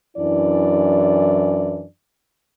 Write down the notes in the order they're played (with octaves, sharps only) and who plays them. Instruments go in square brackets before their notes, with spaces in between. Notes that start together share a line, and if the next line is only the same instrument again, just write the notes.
[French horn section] F#2 E3 D4 E4 D5